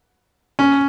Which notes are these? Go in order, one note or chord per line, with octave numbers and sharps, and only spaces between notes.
C#4